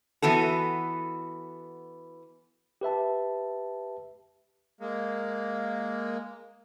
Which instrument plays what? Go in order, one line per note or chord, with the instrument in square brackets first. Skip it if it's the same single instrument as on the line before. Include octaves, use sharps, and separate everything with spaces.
[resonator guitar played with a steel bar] E3 B3 F#4 A4
[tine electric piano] G4 B4 E5 A5
[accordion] G#3 A#3